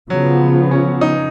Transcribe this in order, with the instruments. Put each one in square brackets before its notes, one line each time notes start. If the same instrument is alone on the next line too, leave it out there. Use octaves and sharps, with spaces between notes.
[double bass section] C#3 F3 B3 [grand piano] F#3
[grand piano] C#4
D#4